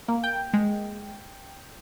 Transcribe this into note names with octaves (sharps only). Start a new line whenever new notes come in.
A#3
G5
G#3